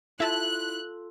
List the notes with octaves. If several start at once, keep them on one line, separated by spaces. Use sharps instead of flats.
E4 F4 A4 E5 A5 F#6